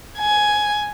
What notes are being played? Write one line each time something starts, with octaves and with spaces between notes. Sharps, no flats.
G#5